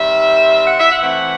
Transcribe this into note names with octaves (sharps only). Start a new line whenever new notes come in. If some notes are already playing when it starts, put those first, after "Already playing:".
Already playing: D#3 G3 C4 E5
F#5
E5
F#5
E3 A3 C4